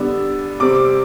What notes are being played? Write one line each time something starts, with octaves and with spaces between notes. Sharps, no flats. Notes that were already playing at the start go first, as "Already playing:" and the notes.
Already playing: D3 G3 B3 D4 E6
C3 G3 C4 D6